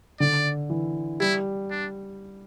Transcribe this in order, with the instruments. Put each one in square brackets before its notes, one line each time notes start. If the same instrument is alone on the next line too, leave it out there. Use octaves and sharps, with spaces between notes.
[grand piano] D3 [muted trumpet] D5
[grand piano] E3
[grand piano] G3 [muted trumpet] E4
[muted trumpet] D4